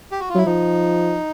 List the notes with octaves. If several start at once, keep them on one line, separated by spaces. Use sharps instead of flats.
G4
F#4
F4
F#3 E4
F3 D#4